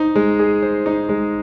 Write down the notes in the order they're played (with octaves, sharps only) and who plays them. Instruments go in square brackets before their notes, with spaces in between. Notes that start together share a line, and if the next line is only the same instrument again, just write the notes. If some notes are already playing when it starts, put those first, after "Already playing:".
Already playing: [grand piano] D#4 C5
G#3
G#4
C5
D#4
G#3